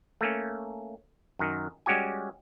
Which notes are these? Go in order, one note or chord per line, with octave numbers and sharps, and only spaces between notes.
A3 A#3 C#4
F#2 D#3
G3 G#3 C#4 F#4 G4 G#5